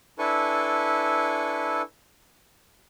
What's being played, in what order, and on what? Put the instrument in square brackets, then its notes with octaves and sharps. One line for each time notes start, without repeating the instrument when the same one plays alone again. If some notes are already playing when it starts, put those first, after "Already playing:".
[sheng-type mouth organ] D4 E4 A4 B4 G#5 C#6